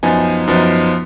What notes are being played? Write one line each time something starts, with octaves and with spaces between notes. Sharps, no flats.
F#2 F3 B3 D#4 G#5
F#2 F3 B3 D#4